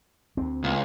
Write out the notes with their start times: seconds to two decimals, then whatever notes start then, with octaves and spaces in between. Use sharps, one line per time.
0.37 D2 C4
0.64 C#2